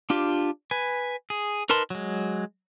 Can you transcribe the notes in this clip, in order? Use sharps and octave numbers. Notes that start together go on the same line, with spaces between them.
D4 F4 G4
B4 G#5
G#4
D#4 A#4 B4 A5 C6
F#3 G#3